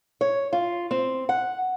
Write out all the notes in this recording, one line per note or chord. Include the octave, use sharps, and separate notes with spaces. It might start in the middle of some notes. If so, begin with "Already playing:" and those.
C#5
F4
C4
F#5